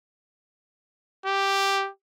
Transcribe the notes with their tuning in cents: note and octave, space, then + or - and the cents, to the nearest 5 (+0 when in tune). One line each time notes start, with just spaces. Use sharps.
G4 +0